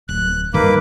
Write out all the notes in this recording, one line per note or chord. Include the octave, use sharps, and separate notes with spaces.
D1 F#6
G2 D#3 A#3 B4 D6